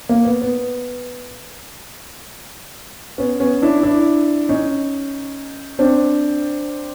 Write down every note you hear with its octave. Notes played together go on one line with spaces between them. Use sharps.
A#3
B3
B3
B3 C#4
B3 C#4
D4 E4
D4 E4
C#4 D#4
C4 D4